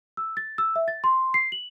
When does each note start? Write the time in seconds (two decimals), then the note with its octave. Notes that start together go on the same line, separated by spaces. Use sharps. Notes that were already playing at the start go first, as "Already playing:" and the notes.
0.17 E6
0.37 A6
0.58 E6
0.76 E5
0.88 A6
1.04 C6
1.34 C7
1.52 F#7